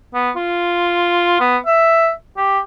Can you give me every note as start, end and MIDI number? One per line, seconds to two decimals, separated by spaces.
0.14 0.31 59
0.36 1.36 65
1.40 1.58 59
1.66 2.11 76
2.37 2.59 67